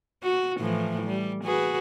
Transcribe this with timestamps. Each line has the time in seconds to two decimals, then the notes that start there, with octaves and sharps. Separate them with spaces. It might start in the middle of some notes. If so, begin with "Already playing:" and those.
0.23 F#4
0.60 A2 E3 F3
1.05 G3
1.44 F#4 G#4 B4